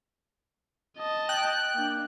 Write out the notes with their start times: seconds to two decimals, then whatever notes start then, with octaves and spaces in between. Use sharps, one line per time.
0.98 D#5 A5
1.29 G5 F#6
1.75 A#3 D4